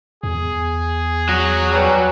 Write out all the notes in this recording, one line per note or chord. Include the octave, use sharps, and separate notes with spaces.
E2 G#4
F#3 A#6
G3 B4 C#5 G#5